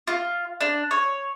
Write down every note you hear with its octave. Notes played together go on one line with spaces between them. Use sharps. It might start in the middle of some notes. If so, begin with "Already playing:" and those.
F4
D4
C#5